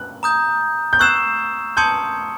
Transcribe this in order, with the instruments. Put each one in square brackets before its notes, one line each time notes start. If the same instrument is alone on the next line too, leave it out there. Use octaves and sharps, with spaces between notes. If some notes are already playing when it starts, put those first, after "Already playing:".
Already playing: [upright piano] F#6
[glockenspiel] A#5 D#6 G6
[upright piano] G6
[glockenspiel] C#6 E6 G#6 C7 E7 [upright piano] F#6
[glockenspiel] A5 C6 D#6 G#6 C#7 [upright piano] G6